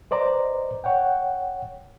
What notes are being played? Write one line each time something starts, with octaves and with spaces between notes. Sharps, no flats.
B4 C5 D5 D#5 A#5
C#5 F#5 G5